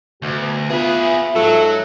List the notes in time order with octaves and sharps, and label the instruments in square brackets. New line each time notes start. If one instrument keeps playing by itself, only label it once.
[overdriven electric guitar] D2 [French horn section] B2 F#4
[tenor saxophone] B3 [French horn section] F4 [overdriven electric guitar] G#4 B4 [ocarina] E5
[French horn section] G#2 [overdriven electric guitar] F#3 [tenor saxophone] A4